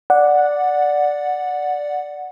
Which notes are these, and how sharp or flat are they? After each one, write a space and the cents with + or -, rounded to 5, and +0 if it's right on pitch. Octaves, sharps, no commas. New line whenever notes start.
D5 +0 F#5 -10